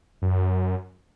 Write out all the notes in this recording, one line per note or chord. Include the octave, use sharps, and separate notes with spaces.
F#2